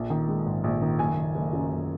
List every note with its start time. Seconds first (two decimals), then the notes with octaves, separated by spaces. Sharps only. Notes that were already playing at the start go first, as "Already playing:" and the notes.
Already playing: A#1
0.10 D#3
0.28 G#3
0.46 G#2
0.64 A#1
0.82 D#3
0.99 F#1 G#5
1.17 D#3
1.35 F#1
1.53 F#2
1.71 F#1